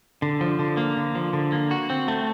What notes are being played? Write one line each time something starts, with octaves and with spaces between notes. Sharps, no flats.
D3
F3
D3
A#3
D3
F3
D3
A#3
F#4
C4
A3